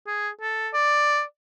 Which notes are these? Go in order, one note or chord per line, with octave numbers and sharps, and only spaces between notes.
G#4
A4
D5